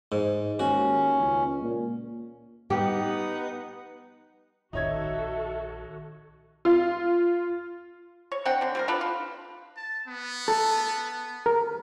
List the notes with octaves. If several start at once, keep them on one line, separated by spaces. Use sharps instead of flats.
G#2
D#2 C#4 F#4
C#2
A#2
B3 D#4 G4
A#1 D#3 D#4 F#4 A4 C#5 E5 G#6
F4
C#5
C4 D4 F#5 G5
D3 C4
G3 C4 A#4
D4 F4 A4 B4
F4
A5
B3
A4
A#4